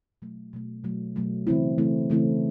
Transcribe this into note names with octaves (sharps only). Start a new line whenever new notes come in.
B2 F#3 A3
B2 F#3 A3
B2 F#3 A3
B2 F#3 A3
C#3 E3 A3 C4 E4
C#3 E3 A3 C4 E4
C#3 E3 A3 C4 E4